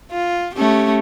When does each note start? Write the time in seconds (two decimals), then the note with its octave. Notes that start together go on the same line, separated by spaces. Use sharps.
0.12 F4
0.55 A3 C#4 G4